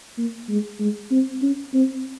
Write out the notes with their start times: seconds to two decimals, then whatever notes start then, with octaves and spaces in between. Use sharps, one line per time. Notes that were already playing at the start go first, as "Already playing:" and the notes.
0.18 A#3
0.49 G#3
0.80 G#3
1.11 C4
1.43 C#4
1.74 C4